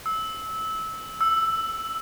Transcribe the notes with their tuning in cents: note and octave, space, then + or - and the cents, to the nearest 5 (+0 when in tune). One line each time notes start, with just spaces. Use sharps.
E6 -20
E6 +5